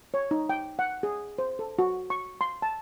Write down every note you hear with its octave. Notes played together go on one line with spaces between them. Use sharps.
C#5
D#4
G5
F#5
G#4
C5
A4
F#4
C#6
C6
A5